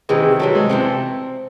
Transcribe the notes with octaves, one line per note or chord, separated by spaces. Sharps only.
C3 D#3 E3 G#3
C3 E3 F#3 A3
G#3
C3 E3 A3 C4